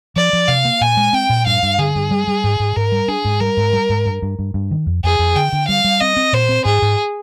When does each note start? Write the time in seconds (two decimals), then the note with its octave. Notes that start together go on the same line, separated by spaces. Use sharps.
0.16 F3 D5
0.33 F3
0.48 C3 F5
0.65 A#3
0.81 A#2 G#5
0.97 G#3
1.13 C4 G5
1.29 A#2
1.46 G2 F5
1.63 G2
1.78 D3 G#4
1.95 G2
2.11 G3
2.27 G3
2.44 G#2
2.60 G#2
2.76 G#2 A#4
2.92 G3
3.08 D4 G#4
3.25 G#2
3.40 G3 A#4
3.57 G#2
3.73 G3
3.89 G#2
4.06 G2
4.22 G2
4.39 G2
4.54 G2
4.71 D#3
4.86 F2
5.04 F2 G#4
5.19 F2
5.36 D3 G5
5.52 D3
5.68 G3 F5
5.84 G3
6.00 C4 D#5
6.17 C4
6.33 A#2 C5
6.49 C4
6.65 G#2 G#4
6.82 G#2